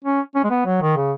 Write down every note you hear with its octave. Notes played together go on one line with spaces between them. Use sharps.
C#4
C#4
G#3
B3
F#3
D#3
C#3